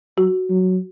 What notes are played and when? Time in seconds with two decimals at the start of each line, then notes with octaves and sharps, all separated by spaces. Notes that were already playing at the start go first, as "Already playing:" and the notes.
0.18 F#3 F#4
0.50 F#3